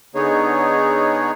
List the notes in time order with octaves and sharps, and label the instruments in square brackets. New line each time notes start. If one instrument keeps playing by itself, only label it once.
[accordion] D3 B3 D#4 G#4 C#5